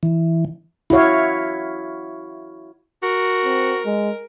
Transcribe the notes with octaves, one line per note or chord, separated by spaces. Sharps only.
E3
E4 F#4 C#5 F5
F#4 A#4
C4
G#3